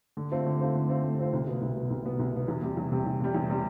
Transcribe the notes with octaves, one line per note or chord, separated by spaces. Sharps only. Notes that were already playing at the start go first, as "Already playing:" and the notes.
D3
A3 C4 F4 C5
D3
A3 C4 F4 C5
D3
A3 C4 F4 C5
D3
A3 C4 F4 C5
C2
B2 B3
C2
B2 B3
C2
B2 B3
C2
B2 B3
E2
C3 G3
E2
C3 G3
E2
C3 G3
E2
C3 G3